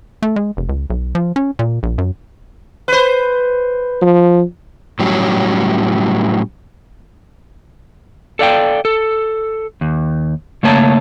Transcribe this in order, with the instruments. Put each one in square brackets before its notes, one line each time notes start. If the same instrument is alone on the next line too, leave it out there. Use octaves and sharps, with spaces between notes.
[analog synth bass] A3
G#3
F1
C#2
B1
F3
C#4
A#2
A#1
F#2
[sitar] B4 C5
[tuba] F3
[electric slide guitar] A2 F#3 G3 C#4
[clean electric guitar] A4 D5 F5 G5
A4
D#2
C#3 A3 A#3 C#5 A5 A#5